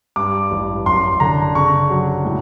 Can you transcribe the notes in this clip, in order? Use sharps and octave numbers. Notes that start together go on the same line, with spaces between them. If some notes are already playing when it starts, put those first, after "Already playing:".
G2 D6
A1
F#2 C6
D3 A#5
C#3 C#6
F#3
A2